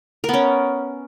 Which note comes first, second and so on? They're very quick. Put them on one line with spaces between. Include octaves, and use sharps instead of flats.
A#4 B3 C#4